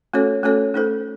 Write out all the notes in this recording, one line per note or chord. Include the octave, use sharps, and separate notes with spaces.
A3 C#4 F#4 A4 C#5
A3 C#4 F#4 A4 C#5
A3 D#4 A4 C5